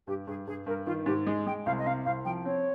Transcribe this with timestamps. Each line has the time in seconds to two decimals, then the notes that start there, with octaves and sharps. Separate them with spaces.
0.07 G2 G4
0.27 G2 G#4
0.47 G2 G#4
0.66 G2 A#4
0.86 D#3 F4
1.06 G#2 G4
1.27 G#3 G#4
1.46 G#3 G5
1.66 C2 F5
1.79 D#5
1.86 C3 F5
2.05 C2 F5
2.25 F3 G5
2.45 C4 C#5